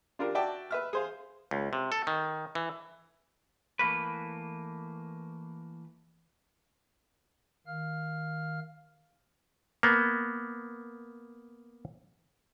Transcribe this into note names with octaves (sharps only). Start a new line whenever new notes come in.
D4 F4 G4 A#4
F#4 D5 E5 G5 A5 D6
B4 E5 F6
G#4 C5 F5
C#2
C3
A4
D#3
E3
E3 A3 A#3 B4
D#3 F5 F6
A#3 B3